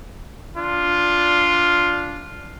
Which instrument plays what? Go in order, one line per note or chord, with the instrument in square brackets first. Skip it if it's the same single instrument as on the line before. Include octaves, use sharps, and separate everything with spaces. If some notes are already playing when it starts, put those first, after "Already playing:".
[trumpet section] D4 F4